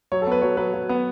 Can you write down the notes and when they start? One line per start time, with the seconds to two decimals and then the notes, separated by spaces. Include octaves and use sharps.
0.12 F#3 C#5
0.22 A4
0.27 B3 B4
0.42 F#3 C#5
0.57 F#3 B4
0.74 F#3
0.89 B3